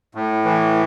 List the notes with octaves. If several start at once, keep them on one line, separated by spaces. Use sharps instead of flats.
A2
E3